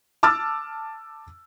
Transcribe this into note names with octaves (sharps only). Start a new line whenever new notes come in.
A5 D6 E6 F6 A6